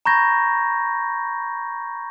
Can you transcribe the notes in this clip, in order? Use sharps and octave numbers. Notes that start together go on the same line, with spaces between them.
A#5 B5 C#6 G6 G#6 A#6